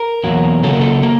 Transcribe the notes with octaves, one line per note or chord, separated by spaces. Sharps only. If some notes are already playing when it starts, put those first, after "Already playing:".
Already playing: A#4
E2 B2 F#3 A#3
C#3 F#3 A#3 A4
A#4
A4
A#3